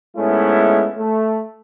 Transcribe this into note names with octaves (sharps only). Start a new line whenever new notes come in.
G#2 G#3 A3 B3 C#4 E4
A3